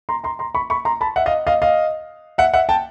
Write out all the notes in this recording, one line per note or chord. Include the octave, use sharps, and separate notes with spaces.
A#5 C6
A#5 C6
A#5 C6
B5 C#6
B5 C#6
A#5 C6
A5 B5
E5 F#5
D#5 F5
D#5 F5
D#5 F5
E5 F#5
E5 F#5
G5 A5